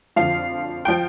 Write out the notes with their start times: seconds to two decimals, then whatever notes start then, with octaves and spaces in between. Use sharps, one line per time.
0.16 F2 D3 F3 F5
0.85 G5
0.88 F3